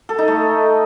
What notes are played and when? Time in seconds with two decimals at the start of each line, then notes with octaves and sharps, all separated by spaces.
0.09 A4
0.18 D#4
0.28 A3